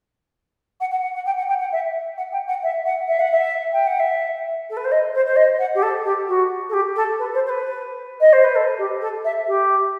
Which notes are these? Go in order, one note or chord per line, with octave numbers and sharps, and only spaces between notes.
F#5
F#5
F#5
F#5
G5
F#5
G5
F#5
E5
F#5
G5
F#5
E5
F#5
E5
F#5
E5
G5
F#5
E5
A4
B4
C5
D#5
C5
C5
D#5
F#5
G4
A4
G4
F#4
A4
G4
A4
B4
C5
C5
B4
D#5
C5
B4
A4
G4
A4
E5
G4